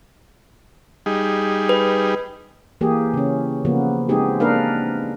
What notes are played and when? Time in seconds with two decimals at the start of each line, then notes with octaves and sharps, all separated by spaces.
1.06 G3 D#4 G#4
1.69 B4
2.81 E3 A#3 G4 G#4
3.14 C#3 C#4
3.65 C#3 F3 A#3 B3
4.09 G#3 B3 C4 D#4 G4 G#4
4.40 A#3 D4 A#4 B4 F5